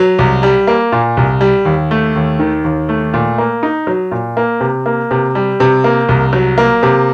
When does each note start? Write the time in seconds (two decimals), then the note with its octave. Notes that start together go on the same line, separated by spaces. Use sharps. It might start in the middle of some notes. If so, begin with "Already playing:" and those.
Already playing: F#3
0.19 C2
0.43 G3
0.67 A#3
0.92 A#2
1.17 C2
1.41 G3
1.65 D#2
1.91 A3
2.16 D#2
2.39 D#3
2.64 D#2
2.89 A3
3.14 A#2
3.38 A#3
3.63 D#4
3.87 F#3
4.11 A#2
4.37 A#3
4.61 C3
4.86 A#3
5.11 C3
5.35 G3
5.60 C3
5.84 A#3
6.09 C2
6.33 F#3
6.58 A#3
6.83 C3